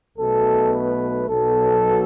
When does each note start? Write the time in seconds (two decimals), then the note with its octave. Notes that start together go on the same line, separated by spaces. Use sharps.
0.17 B1 B2 A3 A4
0.73 B4
1.29 B1 B2 F#3 B3 A4